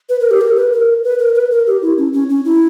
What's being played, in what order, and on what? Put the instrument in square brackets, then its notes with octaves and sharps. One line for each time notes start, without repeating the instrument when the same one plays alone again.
[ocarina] B4
A#4
G4
A#4
B4
A#4
B4
A#4
B4
A#4
G4
E4
C#4
C#4
C#4
E4